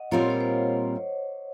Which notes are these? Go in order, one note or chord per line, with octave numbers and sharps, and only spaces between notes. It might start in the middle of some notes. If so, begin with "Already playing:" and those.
Already playing: D#5 F#5
A#2 G3 C4 F4 A#4 C#5
C#5
C5